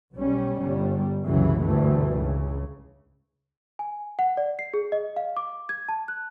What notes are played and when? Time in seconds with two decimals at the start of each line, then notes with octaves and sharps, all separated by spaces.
0.16 B1 G3 C#4
0.62 G1 G3
1.25 F#1 C2 F#2 C#3 E3 F#3
1.60 D2 G2 B2 E3 A3
2.17 C#2 C#3
3.79 G#5
4.19 F#5
4.37 D5
4.59 C7
4.74 G#4
4.92 D#5
5.16 F5
5.37 D6
5.69 G#6
5.89 A5
6.08 F#6